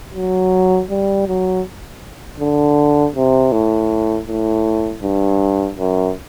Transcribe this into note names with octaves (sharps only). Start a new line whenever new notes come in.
F#3
G3
F#3
D3
C3
A2
A2
G2
F#2